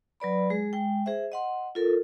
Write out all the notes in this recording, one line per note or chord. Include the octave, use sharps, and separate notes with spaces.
F#3 B4 D5 B5
G#3 G#4
G#3 G5
G#4 C5 E5
D#5 F#5 C6
F4 A4 A#4